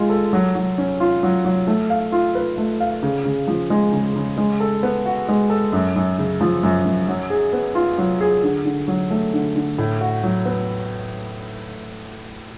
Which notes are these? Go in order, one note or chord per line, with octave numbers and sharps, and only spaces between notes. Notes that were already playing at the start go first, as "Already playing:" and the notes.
Already playing: G#3 F4
A4
F#3
F#3
C#4
F4
F#3
F#3
A3
F5
F4
B4
A3
F5
C#3
C#3
F3
G#3
C#3
C#3
G#3
A4
B3
F#4
G#3
A4
F#2
F#2
C#3
F3
F#2
F#2
F#3
G#4
B3
F4
F#3
G#4
D3
D3
F#3
A3
D3
D3
A2
F#4
F#3
B3